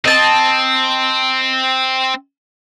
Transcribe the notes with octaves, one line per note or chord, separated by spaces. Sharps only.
C4 D#5 A5